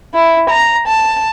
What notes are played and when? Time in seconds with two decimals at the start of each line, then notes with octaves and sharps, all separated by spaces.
0.15 E4
0.50 A#5
0.87 A5